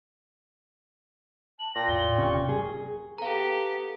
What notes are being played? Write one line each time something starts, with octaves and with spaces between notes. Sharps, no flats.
A5 F#7
A#2 G5 A#6
E2 A2 G7
E1 C3 C#4 C#6
G#4
B3 G4 A4 F5 A#5